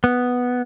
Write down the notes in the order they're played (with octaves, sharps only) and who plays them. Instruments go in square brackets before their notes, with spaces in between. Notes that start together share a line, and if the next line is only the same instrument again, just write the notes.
[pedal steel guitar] B3